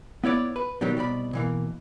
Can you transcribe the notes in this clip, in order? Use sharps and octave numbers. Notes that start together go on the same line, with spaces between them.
B3 E4 C#5 D5
B4
B2 D#3 F#3 G3
C2 B2 D5 B5
B2 E3 A#3